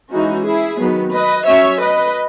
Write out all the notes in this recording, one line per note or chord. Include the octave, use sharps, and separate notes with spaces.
E3 G#3 C#4 D#4 F#4
E4 G#4
D#3 F#3 B3
B4 D#5
F#3 C#4 C#5 E5
B4 D#5